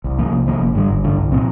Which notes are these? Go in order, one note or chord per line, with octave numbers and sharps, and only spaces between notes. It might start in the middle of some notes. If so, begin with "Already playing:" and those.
C2
C3 F3 A#3
C2
C3 F3 A#3
G1
G2 D3 G3
G1
G2 D3 G3
C2
A#2 F3 C4